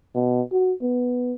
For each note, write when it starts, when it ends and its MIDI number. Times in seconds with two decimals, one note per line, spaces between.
0.15 0.42 47
0.52 0.73 66
0.82 1.35 59